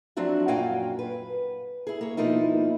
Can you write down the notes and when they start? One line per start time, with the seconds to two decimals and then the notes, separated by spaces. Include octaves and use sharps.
0.17 F3 F#3 C4 D4 E4 F#4
0.48 F#2 A#2 F#4 F5 G5 G#5
0.99 B4
1.87 E4 G#4
2.01 A#3 C#5
2.17 B2 F3 A#3 D#4 E4